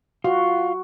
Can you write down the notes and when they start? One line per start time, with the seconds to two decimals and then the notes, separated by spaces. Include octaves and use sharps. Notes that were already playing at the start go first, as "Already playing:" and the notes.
0.24 F4 F#4